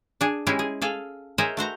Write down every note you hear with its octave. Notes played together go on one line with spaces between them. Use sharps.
D4 G#4
G#3 C#4 E4 G4 G#4
G#4
G#4 A4 F5
G#4 A#4 C5 C#5 D#5 E5
A3 F#4 C5 A#5